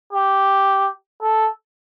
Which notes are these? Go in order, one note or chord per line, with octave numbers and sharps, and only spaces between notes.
G4
A4